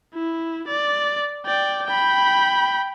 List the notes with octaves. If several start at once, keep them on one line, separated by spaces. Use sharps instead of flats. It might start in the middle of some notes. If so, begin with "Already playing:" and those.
E4
D5
D5 G5
G5 B5